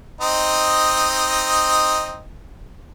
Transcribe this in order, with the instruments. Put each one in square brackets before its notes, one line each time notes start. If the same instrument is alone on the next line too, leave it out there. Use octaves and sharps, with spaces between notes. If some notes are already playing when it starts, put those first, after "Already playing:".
[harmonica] C4 D#4 D#5